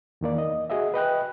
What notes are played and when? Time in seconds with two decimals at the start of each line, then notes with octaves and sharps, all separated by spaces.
0.21 E2 D#3 A#3 D5
0.38 D#5
0.70 F#4 G#4 D#5 E5
0.94 B4 D#5 G5 F#6